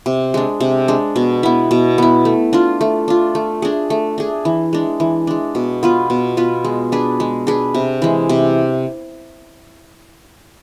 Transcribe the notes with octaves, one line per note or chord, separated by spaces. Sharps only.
C3
G#3 D4
C3
G#3 D4
B2
B3 E4
B2
B3 E4
A3
D4 F4
A3
D4 F4
A3
D4 G#4
A3
D4 G#4
E3
G#3 D4
E3
G#3 D4
B2
B3 F4 B4
B2
B3 F4 B4
G#3
D4 G#4 B4
G#3
D4 G#4 B4
C3
E3 G#3
C3